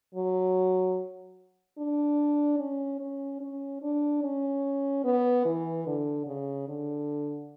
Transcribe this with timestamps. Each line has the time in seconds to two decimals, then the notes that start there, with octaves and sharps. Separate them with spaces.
0.15 F#3
1.78 D4
2.59 C#4
3.00 C#4
3.41 C#4
3.82 D4
4.23 C#4
5.04 B3
5.45 E3
5.87 D3
6.27 C#3
6.68 D3